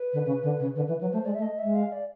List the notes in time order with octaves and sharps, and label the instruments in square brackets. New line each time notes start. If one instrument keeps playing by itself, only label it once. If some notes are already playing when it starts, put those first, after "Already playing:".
Already playing: [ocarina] B4
[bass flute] D3
C#3
D3
C#3
[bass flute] D3 [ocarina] B4
[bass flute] E3 [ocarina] B4
[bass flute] F#3 [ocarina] B4
[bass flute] A3 [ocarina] C5
[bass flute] G#3 [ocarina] D5
[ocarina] E5
[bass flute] A3
[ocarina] D#5
[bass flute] G#3 [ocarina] E5
[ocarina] F5
D5